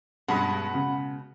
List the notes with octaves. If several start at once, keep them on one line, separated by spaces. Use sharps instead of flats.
G2 B2 G#3 C#4 F#5 B5
C#3